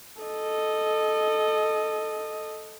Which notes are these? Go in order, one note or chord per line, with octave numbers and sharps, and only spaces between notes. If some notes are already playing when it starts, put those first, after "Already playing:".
A4 D#5